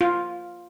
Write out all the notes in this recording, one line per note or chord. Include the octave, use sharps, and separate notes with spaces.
F4